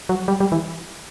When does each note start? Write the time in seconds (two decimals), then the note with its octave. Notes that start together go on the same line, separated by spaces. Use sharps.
0.09 F#3
0.28 G3
0.40 G3
0.52 E3